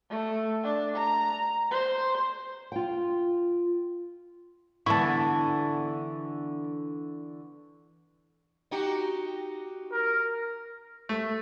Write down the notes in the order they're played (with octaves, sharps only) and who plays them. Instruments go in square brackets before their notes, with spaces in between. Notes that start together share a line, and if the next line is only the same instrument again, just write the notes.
[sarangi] A3
D4
A#5
C5
[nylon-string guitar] F4 G5
[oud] D3 E3 B3 [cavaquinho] E4 A5 [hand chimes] C#6
[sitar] D#4 F#4 G4
[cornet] A#4
[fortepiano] A3